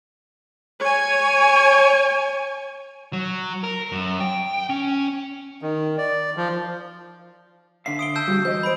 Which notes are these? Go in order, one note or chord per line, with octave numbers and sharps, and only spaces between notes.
C#5 G#5
F#3
A#4
F#2
G5
C#4
D#3
D5
F3
D3 E5 F5 C7
D#6 D7 G7
A5 E6 G6
G3 F#4 G4
E2 F#3 C5 D#5 G6
B5 D7